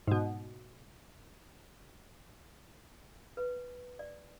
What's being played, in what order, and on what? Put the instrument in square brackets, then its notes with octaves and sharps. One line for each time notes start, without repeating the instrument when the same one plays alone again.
[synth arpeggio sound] G#2 B2
[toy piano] B4
D5